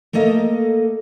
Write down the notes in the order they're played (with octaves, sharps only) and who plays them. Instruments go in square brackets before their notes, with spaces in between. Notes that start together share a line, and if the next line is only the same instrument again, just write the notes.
[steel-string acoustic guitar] A3 A#3 A4 D#5 F5